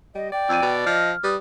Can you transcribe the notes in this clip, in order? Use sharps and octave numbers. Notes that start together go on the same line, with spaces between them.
G3 D#5
D5 G5
F2 E6 D#7
B2 A6
F3 D#5 F6
G3 B4 D#6